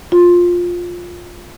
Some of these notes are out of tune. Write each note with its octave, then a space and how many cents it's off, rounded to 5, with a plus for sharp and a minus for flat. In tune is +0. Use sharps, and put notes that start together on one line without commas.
F4 +10